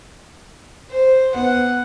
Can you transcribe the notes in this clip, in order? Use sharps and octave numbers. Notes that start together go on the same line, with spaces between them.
C5
B3 F#5